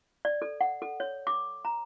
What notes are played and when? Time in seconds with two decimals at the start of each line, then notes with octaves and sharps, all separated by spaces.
0.25 D5
0.42 A4
0.61 F#5
0.82 A4
1.00 C#5
1.27 D6
1.65 A#5